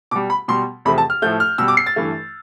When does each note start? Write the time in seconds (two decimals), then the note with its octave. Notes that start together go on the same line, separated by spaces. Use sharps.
0.11 B2 G3 D6
0.30 B5
0.48 B2 G3 C6
0.85 E2 C3 F3 A3 B5
0.98 A5
1.10 F6
1.22 A2 F3 A3 G6
1.40 F6
1.58 B2 G3 E6
1.68 D6
1.77 C7
1.86 A6
1.96 G2 E3 A3